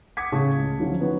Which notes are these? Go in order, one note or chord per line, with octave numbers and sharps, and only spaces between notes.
F#5 D6 D#6 G#6 B6 C#7
A2 C#3 G#4 A5 C#6 D#6
C#2
D3 F3 F#3 C#4 E4
B3 C#4 D#4 F#4